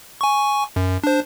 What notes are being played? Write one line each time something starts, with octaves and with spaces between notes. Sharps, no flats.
G#5 C#6
F#2
D4 C5